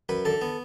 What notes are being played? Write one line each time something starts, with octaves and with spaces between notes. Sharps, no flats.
F#2 B4
D3 A4
B3